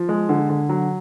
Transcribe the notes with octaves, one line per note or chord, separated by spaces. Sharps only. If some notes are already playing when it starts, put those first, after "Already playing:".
Already playing: F3
G#3
D3
D3
F#3